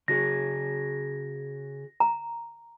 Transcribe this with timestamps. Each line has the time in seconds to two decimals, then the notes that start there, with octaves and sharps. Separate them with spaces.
0.08 C#3 F#4 G#4 A#6
2.00 A#5